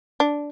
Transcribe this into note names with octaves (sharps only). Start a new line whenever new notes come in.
D4